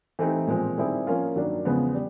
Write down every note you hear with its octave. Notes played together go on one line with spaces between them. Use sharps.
E3 A3 C4 D#4 G4
A#2 F3 G#3 C4
D#3 G3 C4 E4 G#4
F3 A#3 C#4 F4
G2 D#3 F#3 A#3 D4
E2 C#3 F3 G#3 B3
G3